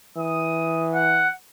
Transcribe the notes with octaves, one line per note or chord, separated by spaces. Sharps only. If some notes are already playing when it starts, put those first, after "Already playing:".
E3 D#6
F#5